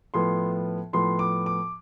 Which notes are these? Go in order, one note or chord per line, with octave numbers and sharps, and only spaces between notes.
A2 F3 B3 C6
A2 F3 B3 C6
D6
D6